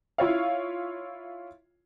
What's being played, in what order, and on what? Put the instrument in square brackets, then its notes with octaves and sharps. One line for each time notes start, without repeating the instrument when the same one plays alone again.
[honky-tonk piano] E4 F4 C#5 F5